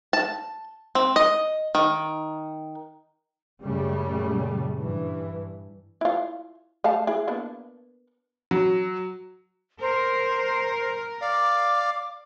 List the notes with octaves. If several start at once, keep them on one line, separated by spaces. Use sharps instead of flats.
A5
C4
D#5
D#3
F#2 A#2 C#3 G3 A3
G2 E3
E4 F4
A3 F5 A5
E4 G#4
A#3 B3 D4
F#3
A#4 C5
D5 F5 D6